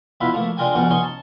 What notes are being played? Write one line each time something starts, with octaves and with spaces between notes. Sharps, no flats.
B2 E4 F4 B5
F3 A3 A#3
G#3 D4 F4 A#4 G5 G#5
B1 F2 C#4 F#4 D6
C#4 D#4 C#5 G#5 C6 C#6
A5